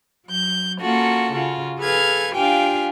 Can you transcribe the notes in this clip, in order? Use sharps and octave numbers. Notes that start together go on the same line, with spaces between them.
F#3 G6
A#3 C#4 F4 F#4 A4
C#3 F4 F#4
G#4 A4 B4 F5 F6 G#6
D4 F4 G4 F5 G5 G#5